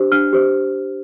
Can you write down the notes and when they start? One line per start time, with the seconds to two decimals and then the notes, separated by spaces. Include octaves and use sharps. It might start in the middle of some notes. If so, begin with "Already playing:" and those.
Already playing: D4 G4 C5
0.12 D4 F6
0.33 G4 C5